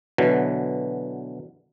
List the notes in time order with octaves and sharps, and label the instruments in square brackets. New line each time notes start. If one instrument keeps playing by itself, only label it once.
[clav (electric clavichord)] B2 D3 E3 F#3